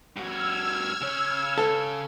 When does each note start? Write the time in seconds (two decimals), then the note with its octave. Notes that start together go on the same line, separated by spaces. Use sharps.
0.16 G2 F#4 E6 F6 G#6
1.01 C#3 C#5
1.58 A4